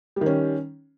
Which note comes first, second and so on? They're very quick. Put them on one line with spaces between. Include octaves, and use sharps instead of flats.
G3 D#3 C#4